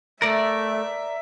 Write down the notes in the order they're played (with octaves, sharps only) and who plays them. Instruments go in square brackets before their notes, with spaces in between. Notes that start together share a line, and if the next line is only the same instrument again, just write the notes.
[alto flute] A3 [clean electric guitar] A#4 D5 [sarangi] E5